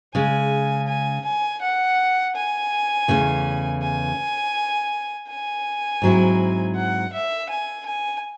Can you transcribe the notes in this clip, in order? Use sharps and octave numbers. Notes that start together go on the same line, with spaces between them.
C#3 G#3 C#4 G#5
G#5
G#5
F#5
G#5
E2 C#3 E3 A3 C#4
G#5
G#5
G#2 F#3 C4 E4
F#5
E5
G#5
G#5